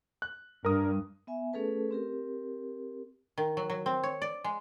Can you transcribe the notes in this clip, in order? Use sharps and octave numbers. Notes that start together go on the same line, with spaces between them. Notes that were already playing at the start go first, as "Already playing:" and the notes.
F#6
G2 A#4 D#6
B3 E5 G#5
A3 C#4 G#4 A4 B4 A5
C4 G4 A#4
D#3
F#3
F#3
C4
C#5
D5
G#3